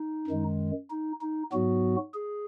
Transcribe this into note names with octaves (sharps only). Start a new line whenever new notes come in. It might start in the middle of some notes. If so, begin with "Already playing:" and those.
Already playing: D#4
F#2 D#3 G#3
D#4
D#4
G#2 F#3 B3 F#4
G#4